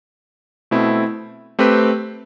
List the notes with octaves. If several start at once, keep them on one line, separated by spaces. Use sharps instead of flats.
B2 A3 C4 E4
A3 C4 G4 B4